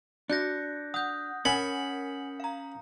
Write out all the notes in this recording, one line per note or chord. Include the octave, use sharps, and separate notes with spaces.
D4 F#4 F#6 G6 A#6 C#7
F#5 D#6 G6
C#4 A#4 F#5 G#5 B5 C#7
F5 A#5